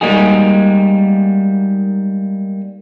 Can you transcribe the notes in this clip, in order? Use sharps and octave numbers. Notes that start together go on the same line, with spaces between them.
G3 G#3 A#3 D#4 F#4 G#4